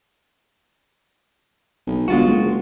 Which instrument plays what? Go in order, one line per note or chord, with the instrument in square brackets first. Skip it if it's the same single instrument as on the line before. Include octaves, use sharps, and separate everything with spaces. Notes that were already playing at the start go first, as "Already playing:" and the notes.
[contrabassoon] B1
[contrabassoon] G1 [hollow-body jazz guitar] G#3 F4 F#4
[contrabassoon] F#1